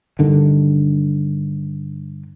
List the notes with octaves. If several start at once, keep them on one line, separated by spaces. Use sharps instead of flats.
G2 D3 D#3